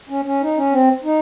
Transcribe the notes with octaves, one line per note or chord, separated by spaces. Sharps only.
C#4
C#4
D#4
C#4
C4
D#4